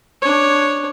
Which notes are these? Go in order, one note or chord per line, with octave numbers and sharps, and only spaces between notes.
D4 C#5